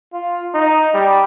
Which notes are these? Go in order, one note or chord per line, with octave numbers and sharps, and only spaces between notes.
F4
D#4
G3